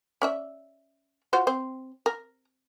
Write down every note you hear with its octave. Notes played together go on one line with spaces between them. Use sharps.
C#4 D5 E5
F4 F#4 C5
C4 C5
A#4